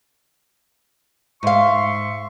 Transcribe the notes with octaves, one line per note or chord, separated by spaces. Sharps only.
G#2 E5 F5 C6 C#6